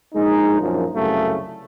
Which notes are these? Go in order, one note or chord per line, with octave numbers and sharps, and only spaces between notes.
A#1 G#3 D#4
A#1 F#2 F3
C2 F#2 C#3 F#3 A3